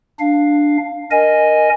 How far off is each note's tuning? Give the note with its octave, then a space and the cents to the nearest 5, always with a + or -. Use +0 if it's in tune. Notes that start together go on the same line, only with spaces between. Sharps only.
D4 +0 F5 +0
A#4 +0 D#5 -5 G#5 +0